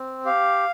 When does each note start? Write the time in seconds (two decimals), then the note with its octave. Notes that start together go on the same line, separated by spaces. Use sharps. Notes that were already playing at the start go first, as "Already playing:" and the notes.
Already playing: C4
0.25 G4 F5